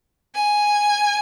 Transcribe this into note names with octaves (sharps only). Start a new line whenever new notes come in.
G#5